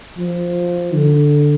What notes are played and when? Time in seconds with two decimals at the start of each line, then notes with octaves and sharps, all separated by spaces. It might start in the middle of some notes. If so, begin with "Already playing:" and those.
0.17 F3
0.94 D3